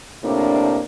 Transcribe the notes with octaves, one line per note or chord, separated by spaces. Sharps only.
A2 C3 A#3 D4